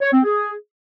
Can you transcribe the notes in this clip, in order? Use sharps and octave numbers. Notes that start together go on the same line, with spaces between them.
C#5
C4
G#4